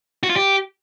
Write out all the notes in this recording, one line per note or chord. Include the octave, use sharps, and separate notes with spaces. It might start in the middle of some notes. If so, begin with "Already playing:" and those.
F#4
F4
G4